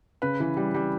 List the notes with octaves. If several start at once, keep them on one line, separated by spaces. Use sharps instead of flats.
C#3 B4
E3
G3
G3